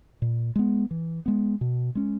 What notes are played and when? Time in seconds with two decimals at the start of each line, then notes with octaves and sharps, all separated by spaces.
0.22 A#2
0.56 G#3 B3
0.91 E3
1.26 G#3 B3
1.61 B2
1.95 G#3 C#4